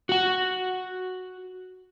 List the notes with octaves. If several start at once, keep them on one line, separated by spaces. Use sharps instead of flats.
F#4 F#5